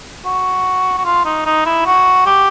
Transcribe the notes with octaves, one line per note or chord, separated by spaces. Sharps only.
F#4
F#4
F4
D#4
D#4
E4
F#4
G4